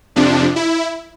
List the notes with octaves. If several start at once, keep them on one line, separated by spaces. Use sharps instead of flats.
F2 C3 F3 D4
E4